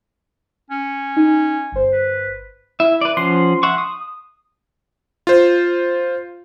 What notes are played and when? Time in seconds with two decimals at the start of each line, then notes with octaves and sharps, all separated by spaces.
0.70 C#4
1.16 D#4 G#5
1.72 G1 C5
1.92 B4
2.80 E4 E5
3.01 B4 D5
3.17 F3 C#4 F#5 C6
3.63 E5 F#5 C#6
3.78 D#6
5.27 F4 C5